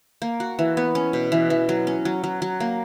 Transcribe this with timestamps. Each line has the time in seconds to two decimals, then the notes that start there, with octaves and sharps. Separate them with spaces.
0.22 A#3
0.40 F#4
0.59 E3
0.77 B3
0.95 C#4
1.13 B2
1.32 E3
1.50 E3
1.69 F#3
1.87 C#4
2.05 F#3
2.24 F#3
2.42 F#3
2.60 A#3